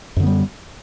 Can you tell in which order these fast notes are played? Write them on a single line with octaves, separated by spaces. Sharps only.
F#2 D3 B3 G3